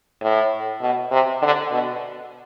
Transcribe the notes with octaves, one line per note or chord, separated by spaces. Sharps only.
A2
B2
C3
D3
B2